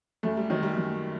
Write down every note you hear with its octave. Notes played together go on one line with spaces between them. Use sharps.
F#2 A3
G3
D#3 F#3
G3
F#2